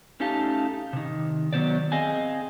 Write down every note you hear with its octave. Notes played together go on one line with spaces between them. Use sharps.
A3 C#4 D#4 G4 F5 A5
C3 D#3
D#3 F#3 B3 C5 D5
C4 G#4 D#5 F5 G#5